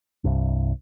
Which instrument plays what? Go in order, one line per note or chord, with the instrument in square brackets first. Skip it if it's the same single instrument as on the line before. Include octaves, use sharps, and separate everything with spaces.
[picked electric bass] C2 G2